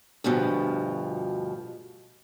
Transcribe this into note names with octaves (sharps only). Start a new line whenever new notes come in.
D2 G2 B2 F3